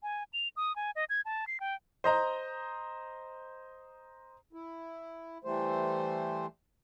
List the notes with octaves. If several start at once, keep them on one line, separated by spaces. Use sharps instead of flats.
G#5
F7
D#6
G#5
D#5
G#6
A5
C7
G5
C5 D#5 A#5
E4
E3 G3 A3 C5